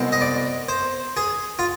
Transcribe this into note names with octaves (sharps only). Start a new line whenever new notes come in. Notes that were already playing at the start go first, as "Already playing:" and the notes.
Already playing: C2 B2 G#3 C4
D#5
D5
C5
G#4
F4